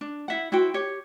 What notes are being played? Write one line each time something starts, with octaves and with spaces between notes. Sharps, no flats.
D4
E4 E5 F#5
E4 F#4 C5 G5
G4 C#5